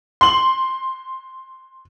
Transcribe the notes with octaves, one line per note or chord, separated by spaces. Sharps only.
C6 F#7